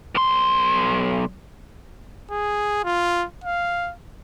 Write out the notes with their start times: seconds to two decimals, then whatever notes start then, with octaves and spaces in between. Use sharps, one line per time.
0.15 B1 C6
2.31 G#4
2.85 F4
3.44 F5